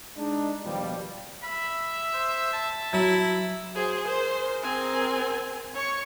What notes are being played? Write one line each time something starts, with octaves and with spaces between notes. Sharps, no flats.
G#3 D4 D#4
D#2 B2 F3 G3
E5 B5
C5
A5
F#3 E4
F#3 G#4 C5
G#4 A#4 C5
C4 G#5
C#5 C#6